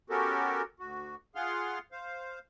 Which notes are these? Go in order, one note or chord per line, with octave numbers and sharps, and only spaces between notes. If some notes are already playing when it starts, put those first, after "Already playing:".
B3 C#4 F#4 G4 A4 A#4
D2 F#4
F4 G#4 F5 F#5 C6 F6
C5 F5